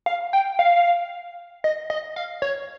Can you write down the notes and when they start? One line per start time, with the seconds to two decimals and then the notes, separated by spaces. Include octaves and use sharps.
0.06 F5
0.33 G5
0.59 F5
1.64 D#5
1.90 D#5
2.16 F5
2.42 C#5